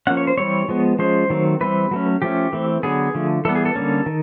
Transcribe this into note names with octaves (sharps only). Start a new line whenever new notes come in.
F3 A#3 C#4 F#5
C#5
C5
E3 G3 C4 C#5
F3 G#3 B3
F3 G#3 C#4 C5
D#3 F#3 A3 C4
E3 G3 C4 B4
F#3 A3 C#4
F3 A3 C#4 G4
E3 A3 C4
D3 F#3 B3 G#4
D3 F3 A3
E3 G3 B3 A4
G#4
A4
D3 G3 A#3 C#4
D#3